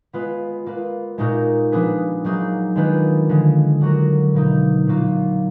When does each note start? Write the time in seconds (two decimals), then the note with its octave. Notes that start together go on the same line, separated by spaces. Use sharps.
0.13 G#3 B3 F4 B4
0.66 A#3 F4 B4
1.18 A#2 G#3 D#4 F#4 A#4
1.72 F3 B3 D4 G#4 B4
2.24 F#3 A#3 D#4 G#4
2.76 D#3 G#3 D4 F4 B4
3.29 D3 F3 G#3
3.81 F#3 D4 F#4 A#4
4.34 B2 A#3 D#4
4.87 A#2 F#3 A#3 F4